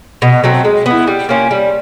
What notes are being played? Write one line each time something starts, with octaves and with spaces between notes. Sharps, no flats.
B2
F#3 A3 C4
G#3
B3 E4
G3
A#3 C#4 F4
G3